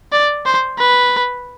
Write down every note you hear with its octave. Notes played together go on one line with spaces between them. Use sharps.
D5
C5
B4